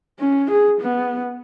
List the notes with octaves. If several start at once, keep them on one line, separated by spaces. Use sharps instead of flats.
C#4
G#4
B3